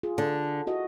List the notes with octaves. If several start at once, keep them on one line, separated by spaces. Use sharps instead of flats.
F4 G#4
D3
E4 F#4 D#5